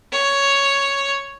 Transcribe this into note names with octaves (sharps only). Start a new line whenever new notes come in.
C#5